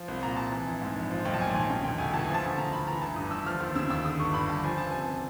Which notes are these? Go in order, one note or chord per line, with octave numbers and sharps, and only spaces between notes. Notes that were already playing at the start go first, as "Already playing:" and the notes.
Already playing: F3
C2
A#2 A#5
C2 A5
E3
A#1
G#2
A#1
F3
B1 G5
A5
A#2 G#5
B1 G#5
C#3 G5
E1 G5
D2 G#5
E3 A5
F3 G#5
A5
D2
C#3 A#5
D2 B5
E3 A#5
G1 A5
G2 D#6
G1 E6
F3 F6
D#2
C#3 E6
D#2 E6
D3 D#6
G1 C#6
G2 B5
G1 A5
F3 G#5
C#2 A5
C3 G#5